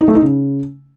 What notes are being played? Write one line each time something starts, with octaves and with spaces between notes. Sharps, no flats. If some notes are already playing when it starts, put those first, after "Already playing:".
D#4
A3
D#4
C#3